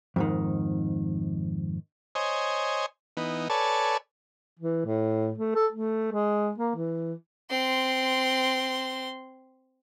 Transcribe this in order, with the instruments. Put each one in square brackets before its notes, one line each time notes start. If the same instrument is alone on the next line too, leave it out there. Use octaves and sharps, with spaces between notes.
[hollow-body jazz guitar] F2 G#2 D#3
[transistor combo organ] C5 C#5 D#5 G#5
E3 B3 D#4
A4 B4 C#5 D5 G#5 A5
[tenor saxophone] E3
A2
A3
A4
A3
G#3
A#3
E3
[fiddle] C4 C6